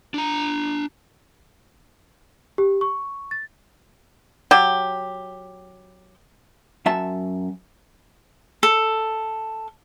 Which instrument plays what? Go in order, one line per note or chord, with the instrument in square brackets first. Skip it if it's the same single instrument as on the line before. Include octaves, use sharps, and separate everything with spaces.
[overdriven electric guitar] D4 A#5
[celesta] G4
C#6
A6
[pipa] F#3 G4
[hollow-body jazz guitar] F#2 E5 A5
[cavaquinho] A4